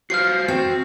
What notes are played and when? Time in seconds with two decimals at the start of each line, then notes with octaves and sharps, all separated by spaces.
0.10 F#4 C5 F5 F6 C7
0.48 C4 F#4